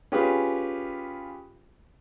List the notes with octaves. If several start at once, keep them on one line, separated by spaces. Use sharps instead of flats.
C#4 F4 G4 G#4 B4